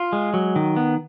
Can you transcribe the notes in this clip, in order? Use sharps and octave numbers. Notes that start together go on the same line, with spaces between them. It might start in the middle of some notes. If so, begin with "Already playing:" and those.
Already playing: F4
G#3
F#3
D#3
B3